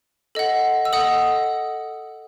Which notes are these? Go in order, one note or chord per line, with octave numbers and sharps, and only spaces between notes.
A4 D#5 F#5
E6
A4 D#5 F#5 D#6